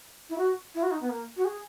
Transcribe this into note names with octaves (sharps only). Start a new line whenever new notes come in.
E4
F#4
E4
F#4
D#4
B3
A#3
F#4
G#4